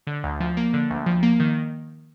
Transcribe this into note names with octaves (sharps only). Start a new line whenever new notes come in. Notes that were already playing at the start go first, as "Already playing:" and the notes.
D3
D2
F3
A#3
D3
D2
F3
A#3
D#3